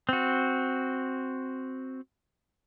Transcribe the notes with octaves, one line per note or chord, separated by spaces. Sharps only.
C4 F#4